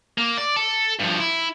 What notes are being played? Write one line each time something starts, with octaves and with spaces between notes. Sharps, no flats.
A#3
D5
A4
G2 F3
E4